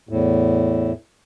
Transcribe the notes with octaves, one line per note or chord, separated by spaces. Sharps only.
E2 A2